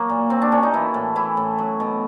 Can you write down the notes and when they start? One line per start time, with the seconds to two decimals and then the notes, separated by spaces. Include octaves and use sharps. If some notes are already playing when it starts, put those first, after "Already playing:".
Already playing: F#3 A#3
0.09 A#2
0.30 F#3 C4
0.42 D4
0.52 A#2 C#4
0.63 D#4
0.74 E3 E4
0.94 A2
1.16 E3 E4
1.37 A2
1.59 F#3
1.80 B2